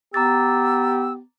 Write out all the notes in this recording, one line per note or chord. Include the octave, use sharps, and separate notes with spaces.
B3 G4 A#5 D6 E6 A6